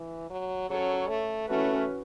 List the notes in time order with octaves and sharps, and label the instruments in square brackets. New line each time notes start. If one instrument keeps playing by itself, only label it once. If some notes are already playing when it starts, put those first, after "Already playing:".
Already playing: [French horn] E3
F#3
[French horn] F#3 [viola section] C#4 A4 C#5
[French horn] A3
[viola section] E3 C#4 F#4 B4 [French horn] A3